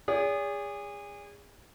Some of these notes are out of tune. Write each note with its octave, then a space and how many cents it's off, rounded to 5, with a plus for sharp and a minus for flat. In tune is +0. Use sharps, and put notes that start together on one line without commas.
G#4 -30 D5 -45